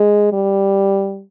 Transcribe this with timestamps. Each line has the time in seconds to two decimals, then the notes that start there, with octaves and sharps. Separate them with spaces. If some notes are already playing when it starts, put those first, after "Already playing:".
Already playing: G#3
0.32 G3